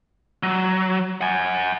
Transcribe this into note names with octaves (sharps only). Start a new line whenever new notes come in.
F#3
F#5 G#5